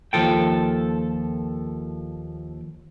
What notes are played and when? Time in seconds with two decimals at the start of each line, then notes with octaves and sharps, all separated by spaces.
0.13 D#2 F3 A4 G5